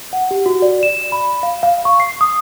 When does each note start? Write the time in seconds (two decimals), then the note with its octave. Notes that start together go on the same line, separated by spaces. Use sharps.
0.13 F#5
0.31 G4
0.46 F#4
0.62 D5
0.83 E7
1.12 B5
1.43 F5
1.63 F5
1.85 C#6
2.00 C7
2.21 D#6